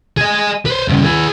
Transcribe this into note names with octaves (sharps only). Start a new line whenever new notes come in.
G#4 D#5
B4 C5
G2 C#3
G#4 B4